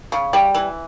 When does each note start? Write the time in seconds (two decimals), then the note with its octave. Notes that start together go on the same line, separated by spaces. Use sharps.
0.12 C#3
0.33 G3
0.55 E3